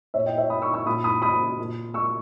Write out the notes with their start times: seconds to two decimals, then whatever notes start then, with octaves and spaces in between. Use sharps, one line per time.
0.14 A#2 C#5 E5
0.26 D#5 G5
0.38 C#5 E5
0.50 B5 D#6
0.62 C#6 E6
0.74 C#6 E6
0.86 A#2 B5 D#6
1.04 B5 D#6
1.22 B5 D#6
1.59 A#2
1.94 C#6 E6